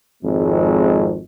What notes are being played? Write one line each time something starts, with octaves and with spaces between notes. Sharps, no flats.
G#1 F2 G#3